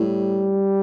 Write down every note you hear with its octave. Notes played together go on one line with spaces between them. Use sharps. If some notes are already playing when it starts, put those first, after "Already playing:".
Already playing: A2 G3